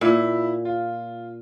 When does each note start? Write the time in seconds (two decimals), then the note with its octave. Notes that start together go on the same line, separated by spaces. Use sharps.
0.01 A#2 E4
0.65 F4